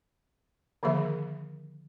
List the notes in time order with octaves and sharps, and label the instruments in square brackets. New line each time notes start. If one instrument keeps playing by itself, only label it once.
[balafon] D3 D#3 F3 A#3 G#4 E5